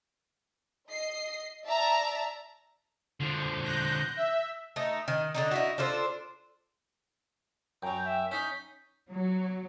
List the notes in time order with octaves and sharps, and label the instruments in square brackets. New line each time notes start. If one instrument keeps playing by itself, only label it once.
[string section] D#5 C7
D5 E5 A5 A#5
[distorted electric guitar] D3 F3
[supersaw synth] F#6 G6 A#6
E5
[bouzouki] A3 D#4
D#3
D3 D4 D#4
D#4 E4 F#4
D4 F4 A4 C5
[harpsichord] F#2 F#3 [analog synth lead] G5 [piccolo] A#5
[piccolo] E5
[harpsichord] C#4 D#4 [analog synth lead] G6 [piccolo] B6
[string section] F#3